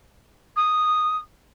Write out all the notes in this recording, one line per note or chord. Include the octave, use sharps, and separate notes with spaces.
D#6